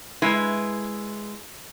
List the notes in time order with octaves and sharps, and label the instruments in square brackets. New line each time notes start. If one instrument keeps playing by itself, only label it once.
[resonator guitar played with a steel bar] G#3 E4 B4